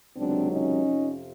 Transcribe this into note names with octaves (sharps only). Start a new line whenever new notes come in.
C#2 C3 D#3 F#3 C4 D4
C#4 D#4
F2 C3 F3